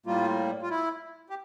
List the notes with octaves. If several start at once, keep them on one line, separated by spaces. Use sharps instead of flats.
A2 G3 A#3 F4
F4
E4
G4